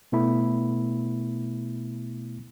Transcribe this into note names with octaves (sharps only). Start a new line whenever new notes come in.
B2 A3 B3 E4 B5